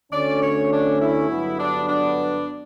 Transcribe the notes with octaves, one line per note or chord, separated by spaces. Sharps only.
D2 D3 A3 C#4 D5
C#5
D4
E4
G1 G2 F#3 B3
D4
D4